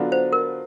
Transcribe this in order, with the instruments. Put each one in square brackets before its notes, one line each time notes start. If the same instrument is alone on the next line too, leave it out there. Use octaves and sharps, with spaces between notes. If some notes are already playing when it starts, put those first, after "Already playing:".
Already playing: [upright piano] D3 F#3 B3 D4 F4
[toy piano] C5
A#4